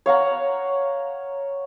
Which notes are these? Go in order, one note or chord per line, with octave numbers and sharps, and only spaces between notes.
C#5 F5 F#5 A#5